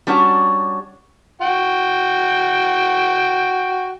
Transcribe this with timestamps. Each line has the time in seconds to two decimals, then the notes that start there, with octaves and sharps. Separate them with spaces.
0.07 G3 C#4 D4 F#4
1.41 F#4 G5